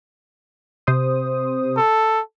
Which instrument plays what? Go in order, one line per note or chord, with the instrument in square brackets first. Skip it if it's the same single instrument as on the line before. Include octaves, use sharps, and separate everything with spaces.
[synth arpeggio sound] C3 C5 D#6
[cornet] A4